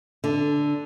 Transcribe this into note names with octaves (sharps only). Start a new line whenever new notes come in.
D3